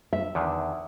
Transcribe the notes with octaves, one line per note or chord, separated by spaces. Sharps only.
E5
E2 D3 D#3